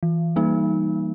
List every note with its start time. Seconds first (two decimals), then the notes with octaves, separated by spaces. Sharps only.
0.03 E3
0.36 G3 A#3 D#4